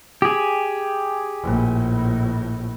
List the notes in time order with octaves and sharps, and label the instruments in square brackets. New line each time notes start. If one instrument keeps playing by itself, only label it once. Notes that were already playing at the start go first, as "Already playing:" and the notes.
[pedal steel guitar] G4 G#4
[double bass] A#1 A2